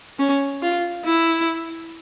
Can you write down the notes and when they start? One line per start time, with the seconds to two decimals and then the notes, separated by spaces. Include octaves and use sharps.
0.19 C#4
0.62 F4
1.05 E4